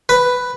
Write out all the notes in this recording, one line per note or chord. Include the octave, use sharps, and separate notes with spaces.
B4